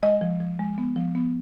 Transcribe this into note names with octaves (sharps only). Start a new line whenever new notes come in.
G#3 D#5
F3
F3
G#3
B3
F3
B3